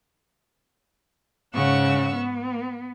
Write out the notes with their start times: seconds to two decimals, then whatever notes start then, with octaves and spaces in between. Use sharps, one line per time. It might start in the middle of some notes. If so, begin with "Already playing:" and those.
1.54 G#2 C#3 F#5 C#6 E6
2.15 B3